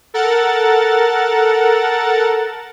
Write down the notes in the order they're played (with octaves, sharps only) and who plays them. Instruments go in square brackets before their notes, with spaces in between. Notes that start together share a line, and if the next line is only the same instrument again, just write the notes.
[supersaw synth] A4 A#4 F#5 A6